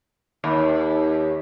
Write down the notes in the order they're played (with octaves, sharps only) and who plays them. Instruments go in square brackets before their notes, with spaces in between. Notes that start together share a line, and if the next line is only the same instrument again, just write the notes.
[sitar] D#2